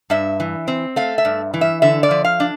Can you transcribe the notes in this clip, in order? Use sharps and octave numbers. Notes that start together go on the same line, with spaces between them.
G2 E5
E3
C4
A3 F5
E5
G2
E3
E5
D3 E5
D5
F3
F5
D4